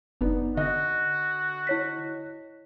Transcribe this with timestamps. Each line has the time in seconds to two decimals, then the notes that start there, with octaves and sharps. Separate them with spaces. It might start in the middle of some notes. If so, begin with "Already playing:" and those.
0.21 F#1 B3 D4 D#4
0.57 D3 F#4 D#5
1.67 E4 C#5 B6